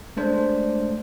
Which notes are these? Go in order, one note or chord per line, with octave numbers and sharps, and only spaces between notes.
G#3 A3 D4 C5